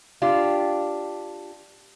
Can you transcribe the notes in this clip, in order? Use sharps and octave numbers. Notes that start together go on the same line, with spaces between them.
D4 F4 G4